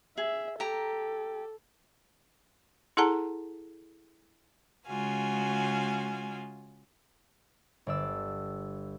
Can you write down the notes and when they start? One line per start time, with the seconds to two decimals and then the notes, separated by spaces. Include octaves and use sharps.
0.18 G#4 E5
0.60 G4 A4 A#5
2.97 E4 G#4 A4 F#5 A5 A#5
4.88 C#3 G#3 F4 F#4 G#5
7.87 G1 D5 E6